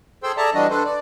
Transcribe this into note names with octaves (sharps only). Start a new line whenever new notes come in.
G#4 A4 C5 G5 C6 E6
G#4 A4 D5 E5 A5 A#5
E3 G3 D4 F#4 D#5
D4 A4 B4 C5
D5